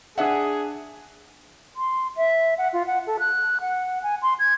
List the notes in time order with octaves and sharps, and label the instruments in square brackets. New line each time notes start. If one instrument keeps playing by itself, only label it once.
[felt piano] D4 E5 F#5 [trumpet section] G#4
[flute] C6
E5
F#5
F4
F#5
A4
F#6
F#5
G#5
C6
G#6